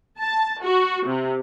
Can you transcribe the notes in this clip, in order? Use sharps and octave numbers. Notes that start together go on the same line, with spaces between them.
A5
F#4
C3